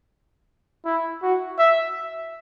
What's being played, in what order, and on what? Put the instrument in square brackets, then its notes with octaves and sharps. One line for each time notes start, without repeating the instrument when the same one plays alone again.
[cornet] E4
F#4
E5